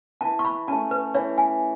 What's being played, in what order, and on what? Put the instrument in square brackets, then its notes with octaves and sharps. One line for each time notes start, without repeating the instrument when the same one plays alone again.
[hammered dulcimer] E3 [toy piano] A5
[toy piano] C#6
B5
[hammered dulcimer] A3 C#4 [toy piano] A5
[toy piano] B4
[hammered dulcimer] E3 [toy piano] C#5
[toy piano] G#5